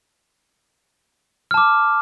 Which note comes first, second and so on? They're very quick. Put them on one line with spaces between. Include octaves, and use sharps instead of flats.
F6 A5 D6